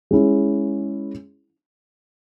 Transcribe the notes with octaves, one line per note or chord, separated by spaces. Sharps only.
G#3 C#4 E4